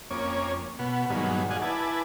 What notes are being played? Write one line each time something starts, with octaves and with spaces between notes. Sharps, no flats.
F2 A#3 C#4 C#5 D6
B2 B3
G2 A#2 D#3 F#3 G#3 B3
G#4 D5 D#5 F5 F#5 G#5
E4 B4 G#5 A5 D6